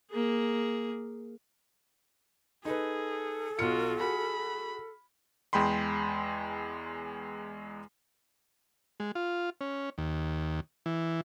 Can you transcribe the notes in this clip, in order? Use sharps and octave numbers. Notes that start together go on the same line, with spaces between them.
A#3 G#4
D#4 G#4 A4 B4
B1 F4 F#4 F6 C#7
F#4 G#4 B5
E2 G#3 G5 B5 C6
G#3
F4
C#4
D#2
E3